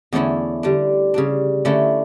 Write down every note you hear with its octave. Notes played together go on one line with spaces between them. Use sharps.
E2 D3 A3 C#4 E4
D3 G3 D4
C#3 G3 D4
D3 A3 C#4 E4